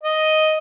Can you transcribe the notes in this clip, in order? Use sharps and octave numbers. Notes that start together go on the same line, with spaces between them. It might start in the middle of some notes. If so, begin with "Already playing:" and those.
D#5